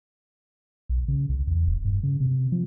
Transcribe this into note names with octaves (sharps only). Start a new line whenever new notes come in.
B1
C#3
C2
E2
E1
G2
C#3
C3
F3